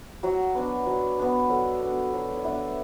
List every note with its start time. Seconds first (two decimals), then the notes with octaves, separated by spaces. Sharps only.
0.23 F#3 F#4
0.55 B3 D4
0.86 F#3
1.18 B3 D4
1.49 F#3 A4
1.82 B3 D4
2.14 F#3
2.37 D5
2.44 B3 D4 B4 E5